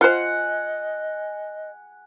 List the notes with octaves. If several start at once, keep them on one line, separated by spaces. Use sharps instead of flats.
F4 C5 D#5 F#5 G#5